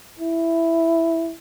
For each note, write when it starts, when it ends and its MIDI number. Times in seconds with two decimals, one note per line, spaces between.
0.19 1.34 64